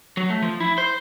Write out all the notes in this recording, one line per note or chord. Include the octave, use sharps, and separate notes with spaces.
F#3
A3
F3
E4
C5